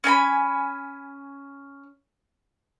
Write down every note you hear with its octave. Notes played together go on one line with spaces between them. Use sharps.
C#4 G#5 A#5 B5